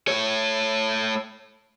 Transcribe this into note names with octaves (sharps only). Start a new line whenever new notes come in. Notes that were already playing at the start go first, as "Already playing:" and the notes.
A3 C#5